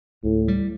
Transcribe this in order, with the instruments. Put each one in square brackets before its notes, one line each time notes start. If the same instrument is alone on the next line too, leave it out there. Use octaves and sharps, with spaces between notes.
[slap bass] D2 [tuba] A2
[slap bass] G3